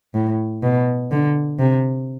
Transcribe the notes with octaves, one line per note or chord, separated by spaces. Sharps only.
A2
B2
D3
C3